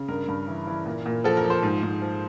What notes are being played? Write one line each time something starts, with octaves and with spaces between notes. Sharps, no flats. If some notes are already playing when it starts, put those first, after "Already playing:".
Already playing: C#3
G2 A#4
G2
E3
E3
A#2
A#2
F3 A4
A#4
F3
C5
G#2
G#2
F3